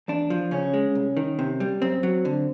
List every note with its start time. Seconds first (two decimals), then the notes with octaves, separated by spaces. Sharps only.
0.08 E2 D4
0.30 F3
0.51 C#3 C#4
0.74 G#3
0.95 C2
1.17 D#3
1.39 C3
1.60 G3
1.82 F#2 C4
2.03 F#3
2.25 D3